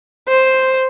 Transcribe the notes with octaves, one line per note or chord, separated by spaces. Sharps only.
C5